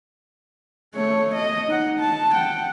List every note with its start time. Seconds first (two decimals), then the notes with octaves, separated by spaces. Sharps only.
0.95 A3 C#5
1.35 D#5
1.67 D#4 F#5
2.00 A5
2.33 F#5 G5